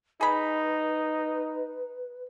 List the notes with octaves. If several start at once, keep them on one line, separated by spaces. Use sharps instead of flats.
D#4 G#4 B4 B5